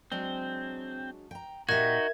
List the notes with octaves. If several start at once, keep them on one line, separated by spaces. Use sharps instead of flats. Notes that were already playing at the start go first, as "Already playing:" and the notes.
F#3 G#3 C4 D4
G5 A#5
A#2 D#4 F#4 G4 A#4 E5 G#6